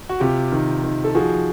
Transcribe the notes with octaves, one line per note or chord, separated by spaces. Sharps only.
F#4
C3 F4 G4
D#3
D#3
A4
F3 F#4 G#4